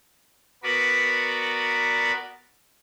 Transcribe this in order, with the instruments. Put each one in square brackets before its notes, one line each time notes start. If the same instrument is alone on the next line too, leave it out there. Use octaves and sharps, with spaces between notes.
[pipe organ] B3 F#4 A#4 B4 D5 B5